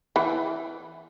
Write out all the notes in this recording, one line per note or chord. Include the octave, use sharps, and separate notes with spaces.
E3